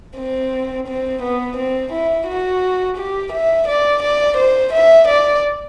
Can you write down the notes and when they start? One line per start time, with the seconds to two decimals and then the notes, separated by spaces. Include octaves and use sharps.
0.17 C4
0.88 C4
1.23 B3
1.57 C4
1.93 E4
2.27 F#4
2.97 G4
3.33 E5
3.68 D5
4.03 D5
4.37 C5
4.73 E5
5.08 D5